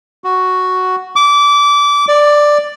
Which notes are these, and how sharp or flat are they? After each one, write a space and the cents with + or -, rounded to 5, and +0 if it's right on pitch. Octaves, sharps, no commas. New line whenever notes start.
F#4 +0
D6 -20
D5 +5